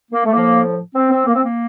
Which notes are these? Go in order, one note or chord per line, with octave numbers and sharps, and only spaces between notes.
A#3
A3
A2 F3 A#3
C4
C4
A#3
C4
A#3